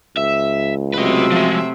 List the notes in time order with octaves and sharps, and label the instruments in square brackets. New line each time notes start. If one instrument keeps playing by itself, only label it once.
[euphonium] C#2 [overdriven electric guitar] E5
[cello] C3 A3 [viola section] F#3 E5 [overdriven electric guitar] B4 D#5
[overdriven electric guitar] F3 G#3